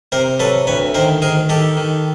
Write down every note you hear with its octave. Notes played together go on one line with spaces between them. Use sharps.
C3 A#4 C5
F#3 A4 B4
D2 B4 C#5
D#3 A#4 C5
D#3 G#4 A#4
D#3 G4 A4
D#3